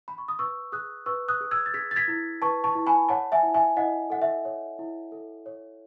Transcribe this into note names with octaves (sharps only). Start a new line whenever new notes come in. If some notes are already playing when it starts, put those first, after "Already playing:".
B5
C#6
D#6
B4 C#6 E6
G#4 D#6 F#6
B4 C#6 E6
D#6 F#6
G#4
E6 G#6
A6
G#4 G#6 B6
A6
G#6 B6
E4
B4 A5 C#6
A5 C#6
E4
G#5 B5
C#5 F#5 A5
E5 G#5
E4
E5 G#5
E4 D#5 F#5
A4 F#5
E5
C#5
E4
A4
C#5